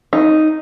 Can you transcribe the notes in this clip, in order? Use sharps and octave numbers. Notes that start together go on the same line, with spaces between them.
D#4